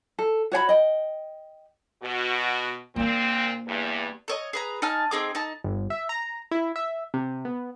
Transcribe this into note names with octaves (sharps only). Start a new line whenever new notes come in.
A4
F#4 C#5 G5 B5
D#5 G5
B2 F#4
A#2 A#3 C4 D4
E2 G2
A4 C#5 D#5
G#4 B4 A#5
D#4 G#5 A5 F6
C4 D#4 G#4 D6
D#4 A5
G1
E5
A#5
E4
E5
C3
B3